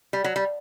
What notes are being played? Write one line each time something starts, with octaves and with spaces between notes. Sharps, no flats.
G3
F#3
G3